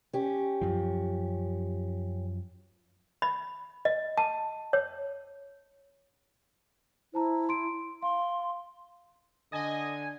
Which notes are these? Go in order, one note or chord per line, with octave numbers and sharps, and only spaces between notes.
C#4 G4
F#2 F3
B5
D#5
A5
C#5
E4 C5 A5 A#5
C6 D7
F5 C6
D3 D#5 G#5